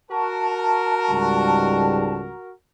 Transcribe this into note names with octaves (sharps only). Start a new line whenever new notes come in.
F#4 A#4 A5
C#2 G#2 G3